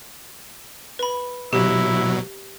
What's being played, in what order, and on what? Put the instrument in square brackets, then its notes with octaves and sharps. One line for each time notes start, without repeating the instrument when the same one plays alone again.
[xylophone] B4 B5
[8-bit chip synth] B2 F#3 [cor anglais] E4 [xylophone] G4